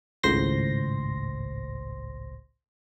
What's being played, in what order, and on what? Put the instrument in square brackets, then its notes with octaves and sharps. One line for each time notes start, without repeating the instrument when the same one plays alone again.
[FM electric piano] G#1 C#2 A2 C5 C6 A#6